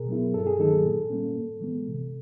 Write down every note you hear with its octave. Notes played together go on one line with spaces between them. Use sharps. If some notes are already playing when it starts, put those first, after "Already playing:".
Already playing: B2 G#4 A#4
F#3 B3 E4
G2 A4
G#4
D#3 F#3 A#3 D#4 A4
A#2
G3 A#3 C#4
A2
E3 G#3 B3
C3